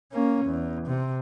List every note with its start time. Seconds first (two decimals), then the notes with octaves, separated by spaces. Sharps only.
0.12 A#3 C#4
0.46 E2
0.87 C3